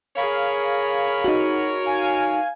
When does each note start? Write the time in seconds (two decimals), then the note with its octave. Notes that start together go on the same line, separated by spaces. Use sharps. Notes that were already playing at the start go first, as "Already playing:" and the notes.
0.16 G#4 A#4 C#5 F5 B5
1.24 D#4 F#4
1.84 F5 G#5